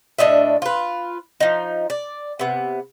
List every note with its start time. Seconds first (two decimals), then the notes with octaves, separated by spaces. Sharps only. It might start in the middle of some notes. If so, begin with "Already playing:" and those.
0.19 A2 D4 D#5 E5
0.62 F4 B4
1.40 F3 D#4
1.90 D5
2.39 C3 B3